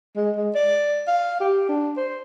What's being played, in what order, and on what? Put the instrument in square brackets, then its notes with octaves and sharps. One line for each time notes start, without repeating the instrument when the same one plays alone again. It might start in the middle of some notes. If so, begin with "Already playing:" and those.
[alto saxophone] G#3
G#3
D5
F5
G4
D4
C5